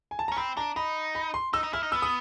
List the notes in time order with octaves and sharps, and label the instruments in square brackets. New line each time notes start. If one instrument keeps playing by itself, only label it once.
[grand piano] G#5
A5
[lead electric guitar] C#4 [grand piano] A#5
[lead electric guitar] C4 [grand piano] B5
[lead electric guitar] D4 [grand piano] A#5
[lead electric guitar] D#4 [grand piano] B5
[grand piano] B5
C6
[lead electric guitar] D#4 [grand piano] E6
[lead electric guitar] D#4
[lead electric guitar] E4 [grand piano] F6
[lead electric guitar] D#4
[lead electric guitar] B3 [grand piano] E6
[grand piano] D#6